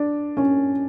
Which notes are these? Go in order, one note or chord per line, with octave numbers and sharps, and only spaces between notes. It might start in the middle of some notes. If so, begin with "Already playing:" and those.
Already playing: D4
C#4